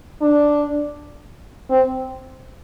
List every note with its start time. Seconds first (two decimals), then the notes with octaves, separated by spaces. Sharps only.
0.21 D4
1.70 C4